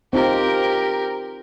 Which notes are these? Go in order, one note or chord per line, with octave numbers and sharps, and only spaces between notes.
C4 D#4 F4 G4 A#4